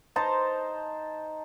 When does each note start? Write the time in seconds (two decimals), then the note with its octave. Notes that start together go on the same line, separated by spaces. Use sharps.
0.16 D#4 C5 A5 A#5